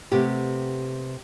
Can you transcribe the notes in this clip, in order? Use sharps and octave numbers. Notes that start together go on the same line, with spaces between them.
C3 A3 B3 G4